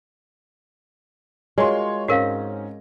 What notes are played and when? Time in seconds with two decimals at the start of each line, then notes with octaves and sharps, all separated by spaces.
1.58 G#3 F4 F#4 A#4 C#5 C6
2.08 G#2 C4 C#4 F#4 A#4 F5 A#6